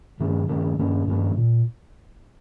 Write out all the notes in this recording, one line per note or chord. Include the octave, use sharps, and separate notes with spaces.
G2 D#3 A#3 C#4
G2 D#3 A#3 C#4
G2 D#3 A#3 C#4
G2 D#3 A#3 C#4
A#2